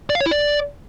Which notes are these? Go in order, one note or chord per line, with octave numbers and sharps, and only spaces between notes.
D5
F5
C#5
E4
D5